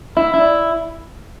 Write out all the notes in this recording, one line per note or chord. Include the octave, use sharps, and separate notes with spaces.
E4 E5
E4
D5